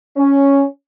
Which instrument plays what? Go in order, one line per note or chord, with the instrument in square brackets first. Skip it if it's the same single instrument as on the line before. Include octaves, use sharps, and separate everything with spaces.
[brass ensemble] C#4